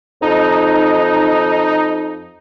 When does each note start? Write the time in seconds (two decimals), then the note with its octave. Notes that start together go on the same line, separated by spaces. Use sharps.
0.22 F2 D#4